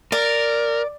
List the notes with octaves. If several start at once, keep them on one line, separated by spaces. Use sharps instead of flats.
A#4 D5